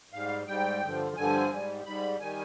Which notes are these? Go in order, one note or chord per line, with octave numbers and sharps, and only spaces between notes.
G#2 G3 F5
G#2 G3 G5
G2 D3 F3
G2 D3 F3 G#5
G#2 G3
G#2 G3 B5
D#3 G3 G#5